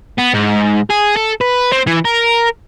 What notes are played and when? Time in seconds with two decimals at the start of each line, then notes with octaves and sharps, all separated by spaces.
0.18 B3
0.34 G#2
0.90 G#4
1.16 A4
1.41 B4
1.72 C4
1.87 E3
2.05 A#4